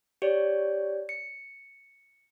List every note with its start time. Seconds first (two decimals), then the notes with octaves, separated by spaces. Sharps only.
0.22 G4 C#5 D5
1.09 C#7